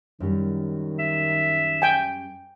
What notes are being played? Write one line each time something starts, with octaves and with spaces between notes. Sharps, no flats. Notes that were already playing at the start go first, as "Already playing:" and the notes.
F#2 D#3 G3
E5
G5 G#5